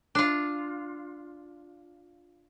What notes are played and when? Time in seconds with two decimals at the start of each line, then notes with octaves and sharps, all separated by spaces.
0.15 D4 F4